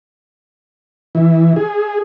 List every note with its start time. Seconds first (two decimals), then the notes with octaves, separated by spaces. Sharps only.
1.15 E3
1.56 G#4